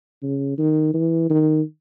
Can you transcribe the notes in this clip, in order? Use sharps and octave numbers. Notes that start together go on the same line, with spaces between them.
C#3
D#3
E3
D#3